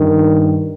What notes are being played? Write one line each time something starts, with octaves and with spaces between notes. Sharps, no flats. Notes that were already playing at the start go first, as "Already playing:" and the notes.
Already playing: G2 D#3